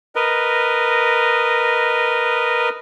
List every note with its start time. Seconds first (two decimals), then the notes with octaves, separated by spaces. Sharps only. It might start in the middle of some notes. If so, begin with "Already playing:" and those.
0.15 A#4 B4 D#5